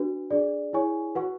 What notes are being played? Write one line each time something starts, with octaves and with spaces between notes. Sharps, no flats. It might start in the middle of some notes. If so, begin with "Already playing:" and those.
Already playing: D4 F#4 B4
D4 G#4 D5
E4 G#4 C#5 G#5 C#6
F#4 B4 F#5 C#6